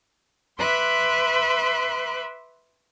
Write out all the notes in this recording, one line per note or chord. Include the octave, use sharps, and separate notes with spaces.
B4 E5 C6 D6 F#6